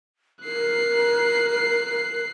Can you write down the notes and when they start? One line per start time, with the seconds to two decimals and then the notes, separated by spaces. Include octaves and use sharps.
0.44 A#4 F#6 C7